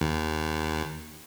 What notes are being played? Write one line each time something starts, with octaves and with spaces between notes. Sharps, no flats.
D#2